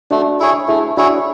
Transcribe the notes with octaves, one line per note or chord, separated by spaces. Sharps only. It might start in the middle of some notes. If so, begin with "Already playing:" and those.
A3 D4 F#4
E4 G#4 C#5
A3 E4 G#4
D4 E4 F#4 G#4 C#5